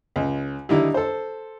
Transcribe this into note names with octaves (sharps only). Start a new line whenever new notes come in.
C#2
D3 D#3 G3 D#4 E4
A4 C5